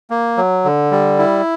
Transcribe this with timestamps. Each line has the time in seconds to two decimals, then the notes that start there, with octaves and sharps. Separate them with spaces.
0.10 A#3
0.37 F#3
0.65 D3
0.92 G3
1.19 E4